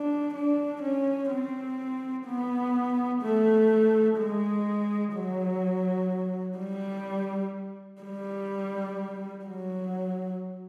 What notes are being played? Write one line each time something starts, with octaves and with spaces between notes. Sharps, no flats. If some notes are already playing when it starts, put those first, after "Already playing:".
Already playing: D4
D4
C#4
C4
B3
A3
G#3
F#3
G3
G3
F#3